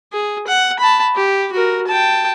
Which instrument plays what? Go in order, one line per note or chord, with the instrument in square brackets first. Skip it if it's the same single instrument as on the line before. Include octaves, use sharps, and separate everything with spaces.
[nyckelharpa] G#4
F#5
A5 B5
G4
F#4 A#4
G5 A5